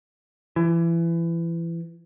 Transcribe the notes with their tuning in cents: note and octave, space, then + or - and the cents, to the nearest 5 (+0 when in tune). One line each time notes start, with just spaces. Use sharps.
E3 +25